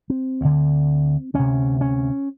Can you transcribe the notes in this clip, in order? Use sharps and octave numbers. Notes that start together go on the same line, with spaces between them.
C4
D2 D3
D2 C3 C#4
C#4